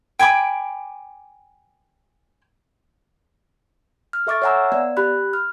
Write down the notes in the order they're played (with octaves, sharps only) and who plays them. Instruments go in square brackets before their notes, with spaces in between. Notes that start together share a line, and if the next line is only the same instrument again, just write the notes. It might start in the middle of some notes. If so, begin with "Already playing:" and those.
[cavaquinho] G5 G#5 B5 D6
[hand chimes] F6
A4 E5 C#6 D6 F6 A6
C#5 E5 F#5 G#5 A#5 E6
B3 D5
G4 B5 F#6
F6